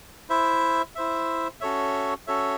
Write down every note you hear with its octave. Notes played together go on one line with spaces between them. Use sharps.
E4 C5 E5
E4 C5 E5
C#4 F#4 A4 C#5 E5
C#4 F#4 A4 C#5 E5